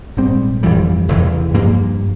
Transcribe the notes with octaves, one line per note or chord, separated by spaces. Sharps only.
A#1 G#2 G3 C4
G1 F2 E3 G3
F1 E2 C#3 E3
G2 F3 A#3